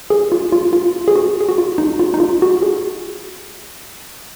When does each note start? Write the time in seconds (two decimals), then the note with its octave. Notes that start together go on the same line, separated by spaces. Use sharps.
0.10 G#4
0.32 F4
0.52 F4
0.73 F4
1.08 G#4
1.16 F#4
1.41 G#4
1.49 F#4
1.58 F4
1.78 D#4
1.99 F4
2.14 D#4
2.20 F4
2.42 F#4
2.62 G#4